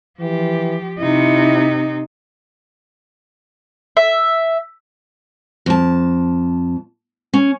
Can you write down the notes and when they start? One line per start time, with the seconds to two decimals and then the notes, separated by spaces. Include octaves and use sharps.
0.20 E3 F3 G4
0.99 C3 D#4 E4
3.97 E5
5.66 F2 A5
7.33 C#4